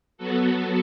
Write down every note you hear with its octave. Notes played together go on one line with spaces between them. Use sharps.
F#3 B3 F#4 A4